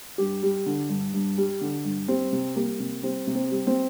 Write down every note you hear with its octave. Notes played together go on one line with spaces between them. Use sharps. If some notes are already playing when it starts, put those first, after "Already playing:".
G2 G4
G3
D3
G2
G2
G3
D3
G2
G3 C4
C3
G3 A#3
C3
G3 C4
C3
C4
G3
C4